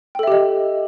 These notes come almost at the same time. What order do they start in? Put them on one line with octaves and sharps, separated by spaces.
G5 A4 E5 G4 D#5